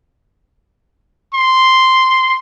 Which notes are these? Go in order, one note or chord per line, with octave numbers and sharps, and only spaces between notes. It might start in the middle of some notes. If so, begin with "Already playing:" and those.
C6